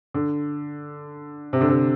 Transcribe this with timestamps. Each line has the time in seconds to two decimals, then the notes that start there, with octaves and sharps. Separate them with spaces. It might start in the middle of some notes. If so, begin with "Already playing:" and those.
0.14 D3
1.53 C3
1.61 D3
1.69 C3